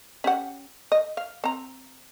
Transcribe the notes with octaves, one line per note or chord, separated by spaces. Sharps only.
C#4 G4 F#5
D#5
F5
C4 A#5